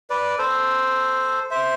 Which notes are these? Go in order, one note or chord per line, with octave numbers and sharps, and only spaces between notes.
B4 D5
A4 C5
C5 E5